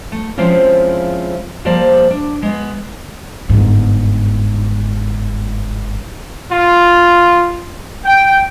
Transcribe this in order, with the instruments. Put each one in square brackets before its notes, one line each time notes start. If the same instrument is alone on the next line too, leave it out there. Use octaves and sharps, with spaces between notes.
[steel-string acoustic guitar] A3
F3 G#3 C4 C#4 E4 F4
F3 G3 A#3 C5 D5 A5
D4
G#3 B3
[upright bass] G1 G#2
[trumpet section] F4
G5